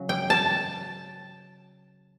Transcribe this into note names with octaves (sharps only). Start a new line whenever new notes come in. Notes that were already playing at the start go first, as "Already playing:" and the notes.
Already playing: C#3 F#3
G5
A5